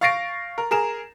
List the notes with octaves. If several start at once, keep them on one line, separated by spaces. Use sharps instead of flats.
F5 C#6 A6 A#6 C7 D7
A#4
G#4 A#4 E7